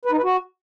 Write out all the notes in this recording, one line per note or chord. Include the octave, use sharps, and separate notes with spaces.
B4
D#4
B4
F#4